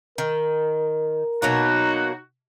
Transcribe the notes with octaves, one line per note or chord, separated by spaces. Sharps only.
D#3 A#4
B2 F#3 A#3 D#4 F#4